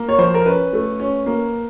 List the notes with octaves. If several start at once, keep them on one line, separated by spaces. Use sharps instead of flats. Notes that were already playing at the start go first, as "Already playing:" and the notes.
Already playing: A#3
C#5
F3 C5
A#4
C#4 B4
A3
C#4
A#3